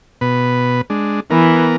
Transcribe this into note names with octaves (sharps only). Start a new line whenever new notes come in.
B2 B4
G#3 D4
E3 B3 A#4